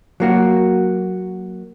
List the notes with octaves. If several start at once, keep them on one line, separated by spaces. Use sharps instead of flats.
F#3 A#3 F#4